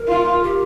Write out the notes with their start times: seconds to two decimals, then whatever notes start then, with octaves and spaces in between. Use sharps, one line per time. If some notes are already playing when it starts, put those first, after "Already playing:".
Already playing: A#4
0.08 F4
0.43 G4